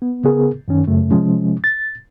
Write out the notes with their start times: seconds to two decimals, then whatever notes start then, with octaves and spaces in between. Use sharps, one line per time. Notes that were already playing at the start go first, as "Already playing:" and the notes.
0.02 B3
0.24 C#3 B3 G#4 A#4
0.68 F#2 D#3 C#4
0.88 F#2 C#3 A3
1.11 C3 F3 G#3 C#4
1.64 A6